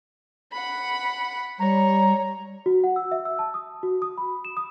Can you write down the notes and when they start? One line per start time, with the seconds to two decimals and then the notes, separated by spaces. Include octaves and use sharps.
0.52 F#5 B5
1.59 G3 C#5 A#5
2.66 F#4
2.84 F#5
2.96 E6
3.12 E5
3.25 E6
3.39 A5
3.54 D#6
3.83 F#4
4.02 D#6
4.18 B5
4.45 E7
4.57 D#6